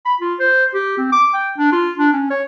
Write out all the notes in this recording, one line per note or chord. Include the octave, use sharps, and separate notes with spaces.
B5
F4
C5
G4
C4
D6
G5
D4
F4
D4
C#4
C#5